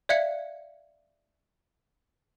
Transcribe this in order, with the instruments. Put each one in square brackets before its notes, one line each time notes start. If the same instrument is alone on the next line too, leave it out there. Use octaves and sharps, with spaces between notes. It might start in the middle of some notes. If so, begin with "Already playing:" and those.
[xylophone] D5 E5 F5 F#6 G#6 C#7